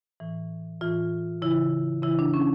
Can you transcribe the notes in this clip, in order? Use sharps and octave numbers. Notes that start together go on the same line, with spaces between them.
A2 E3
A2 E3 F4
C#3 E3 E4
C#3 E3 E4
D4
C#4